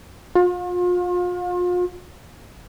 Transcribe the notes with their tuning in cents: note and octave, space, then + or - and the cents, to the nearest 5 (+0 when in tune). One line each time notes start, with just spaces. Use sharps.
F4 +35